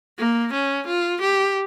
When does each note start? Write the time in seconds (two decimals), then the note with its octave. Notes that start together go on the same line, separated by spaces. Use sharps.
0.18 A#3
0.53 C#4
0.87 F4
1.21 G4